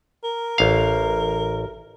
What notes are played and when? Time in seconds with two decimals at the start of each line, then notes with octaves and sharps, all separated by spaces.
0.24 A#4
0.58 A1 F5